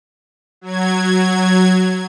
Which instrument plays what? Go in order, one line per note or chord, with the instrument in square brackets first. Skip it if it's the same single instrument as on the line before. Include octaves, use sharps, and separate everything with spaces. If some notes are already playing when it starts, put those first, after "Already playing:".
[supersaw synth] F#3 G#6